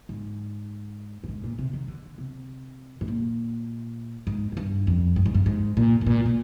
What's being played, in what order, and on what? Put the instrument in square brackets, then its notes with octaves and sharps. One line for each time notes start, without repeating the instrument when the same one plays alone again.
[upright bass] G#2
G2
G#2
A#2
C3
D#3
D3
C3
G#2
A#2
G#2
G#2
G2
F2
G2
G#2
G2
G#2
A#2
G#2
A#2
A#2